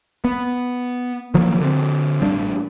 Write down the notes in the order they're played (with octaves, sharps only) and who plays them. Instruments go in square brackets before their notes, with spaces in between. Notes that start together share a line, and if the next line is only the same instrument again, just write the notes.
[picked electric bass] B3
D#3 F3 F#3 A#3
D3 C4
A1 G3 D4